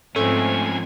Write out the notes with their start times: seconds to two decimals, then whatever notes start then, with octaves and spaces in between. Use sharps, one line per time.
0.16 G#2 F3 A3 C4 C#4 G#5